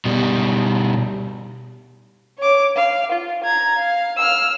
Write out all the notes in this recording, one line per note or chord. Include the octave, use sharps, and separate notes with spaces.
B2 G3
C#5 D6
F5
F4
A#5 G#6
F5
E6 F6